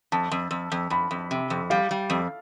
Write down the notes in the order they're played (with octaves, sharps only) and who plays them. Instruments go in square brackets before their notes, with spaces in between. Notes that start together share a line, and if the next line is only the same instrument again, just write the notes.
[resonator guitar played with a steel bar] F2 [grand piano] A5
[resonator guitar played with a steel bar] F2
F2
F2
[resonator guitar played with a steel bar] F2 [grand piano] B5
[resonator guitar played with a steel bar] F2
C3
F2
[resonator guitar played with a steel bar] G3 [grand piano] F5
[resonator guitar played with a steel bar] G3
F2